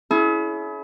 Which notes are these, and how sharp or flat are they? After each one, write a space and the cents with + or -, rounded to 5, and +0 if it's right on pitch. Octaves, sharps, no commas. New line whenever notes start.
C#4 +35 E4 +0 G#4 +40